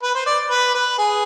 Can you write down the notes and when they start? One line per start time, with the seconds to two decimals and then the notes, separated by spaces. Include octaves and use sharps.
0.03 B4
0.15 C5
0.26 D5
0.50 B4
0.74 B4
0.98 G#4